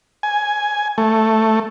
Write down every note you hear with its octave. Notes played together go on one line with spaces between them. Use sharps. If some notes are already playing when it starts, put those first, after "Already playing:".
G#5
A3